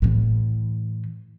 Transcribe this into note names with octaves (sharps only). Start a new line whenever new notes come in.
A2 E3